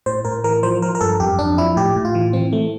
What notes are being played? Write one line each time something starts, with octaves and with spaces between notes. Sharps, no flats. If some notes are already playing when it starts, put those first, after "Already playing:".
A2 C5
A2 A#4
E3 A#4
F3 C5
F3 A#4
A#4
G2 A4
F2 G4
F2 D4
F3 E4
A2 G4
A2
F4
E3
E3 C4
E3 A3